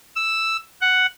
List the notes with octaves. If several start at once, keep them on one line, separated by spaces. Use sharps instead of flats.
E6
F#5